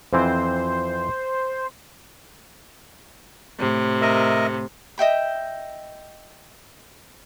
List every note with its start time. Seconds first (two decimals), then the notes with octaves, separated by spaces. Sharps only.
0.13 F2 E3 C4 C5
3.60 A2 C3
4.02 A#4 D#5 E5
4.98 D#5 E5 G5 B5